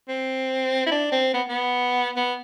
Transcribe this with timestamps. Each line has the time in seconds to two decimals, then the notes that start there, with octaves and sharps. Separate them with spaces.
0.08 C4
0.87 E4
0.92 D4
1.12 C4
1.34 B3
1.49 B3
2.16 B3